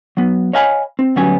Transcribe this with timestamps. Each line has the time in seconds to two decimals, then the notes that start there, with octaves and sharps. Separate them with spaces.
0.17 F#3 B3
0.53 C#5 D#5 F5 G#5 A5 B5
0.99 C4
1.16 D2 F#3 G3 B3 C#4 G#5